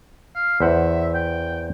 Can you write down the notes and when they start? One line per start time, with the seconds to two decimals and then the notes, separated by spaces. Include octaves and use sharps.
0.35 F5
0.60 E2 C5 E5 F#5
1.14 G5